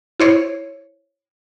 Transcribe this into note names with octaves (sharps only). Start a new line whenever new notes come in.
E4 C5 C#5